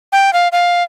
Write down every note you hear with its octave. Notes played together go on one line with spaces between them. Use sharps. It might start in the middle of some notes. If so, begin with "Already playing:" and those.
G5
F5
F5